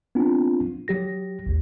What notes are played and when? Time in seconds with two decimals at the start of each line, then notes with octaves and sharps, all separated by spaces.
0.15 B3 C4 D4 F4
0.88 F#3 G4 A#6
1.46 A1 D#2